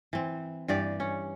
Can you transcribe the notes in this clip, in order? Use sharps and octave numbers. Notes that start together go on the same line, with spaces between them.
E3 C4
G2 E3 G4 D5
C#4